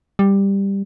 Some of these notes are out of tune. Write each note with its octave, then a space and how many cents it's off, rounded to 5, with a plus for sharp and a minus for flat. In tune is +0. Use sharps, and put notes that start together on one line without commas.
G3 +10